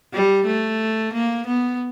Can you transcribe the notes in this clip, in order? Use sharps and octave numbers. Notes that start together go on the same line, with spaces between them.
G3
A3
A#3
B3